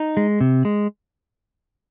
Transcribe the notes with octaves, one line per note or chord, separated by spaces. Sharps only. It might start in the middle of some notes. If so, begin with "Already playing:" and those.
Already playing: D#4
G#3
C3
G#3